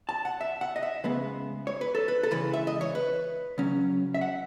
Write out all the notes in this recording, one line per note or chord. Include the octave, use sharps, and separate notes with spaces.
A5
F#5
E5
F#5
D#5
E5
C#3 G#3 B3 B4
C#5
B4
A4
B4
A4
C#3 E3 G#3 B4
E5
D#5
C#5
B4
C#3 F#3 C#4
E5
F#5